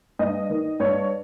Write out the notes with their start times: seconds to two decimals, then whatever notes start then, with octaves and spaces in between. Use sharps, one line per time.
0.19 G2 D#5
0.50 D#3
0.80 G2 C#5